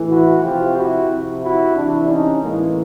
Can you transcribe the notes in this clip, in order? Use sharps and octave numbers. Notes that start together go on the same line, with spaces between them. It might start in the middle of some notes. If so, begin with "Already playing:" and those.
Already playing: A2 E3
E4 F#4
C3 F3 F4 G4
E4 F#4
C3 F3
E4 F#4
C3 E3 D4 E4
C#4 D#4
A2 E3 G#3 A#3